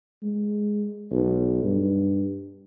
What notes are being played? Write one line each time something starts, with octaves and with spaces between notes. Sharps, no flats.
G#3
B1
G2